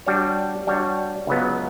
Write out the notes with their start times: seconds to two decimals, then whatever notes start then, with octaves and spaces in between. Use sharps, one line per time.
0.06 G3 D4 F#4 C#5
0.67 G3 D4 F#4 C#5
1.27 C#2 C#3 F#3 B3